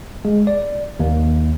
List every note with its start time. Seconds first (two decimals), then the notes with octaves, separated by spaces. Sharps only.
0.25 G#3
0.47 D5
1.00 D#2